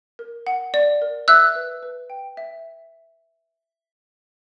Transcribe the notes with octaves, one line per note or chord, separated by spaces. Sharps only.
A#4
F#5
D5
A#4
E5 E6 F#6
B4
B4
G5
E5